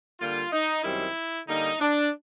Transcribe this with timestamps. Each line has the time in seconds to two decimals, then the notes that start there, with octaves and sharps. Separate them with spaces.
0.20 D3 G3 A#3 F4
0.52 D#4
0.84 F#2 D#3 G3 C4 E4
1.48 D3 G3 A#3 D#4
1.80 D4